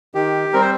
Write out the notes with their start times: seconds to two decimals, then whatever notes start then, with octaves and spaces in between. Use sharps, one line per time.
0.15 D#3 G4
0.53 G3 C4 A#4
0.62 C5